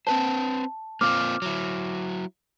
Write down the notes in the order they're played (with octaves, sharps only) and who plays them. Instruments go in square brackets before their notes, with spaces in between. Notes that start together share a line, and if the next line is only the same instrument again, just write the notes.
[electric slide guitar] C4 B4 C5 [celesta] A5
[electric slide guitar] A#3 C4 F4 [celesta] D6 F6
[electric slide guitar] F#3 E4